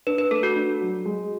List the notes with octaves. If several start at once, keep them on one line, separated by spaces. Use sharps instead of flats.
D4 B4
B4
A3 A4
F#4
D4
F#3
G#3